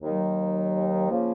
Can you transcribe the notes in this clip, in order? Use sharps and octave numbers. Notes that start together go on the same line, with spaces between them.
D#2 D#3 F#3
C#3 F3 A#3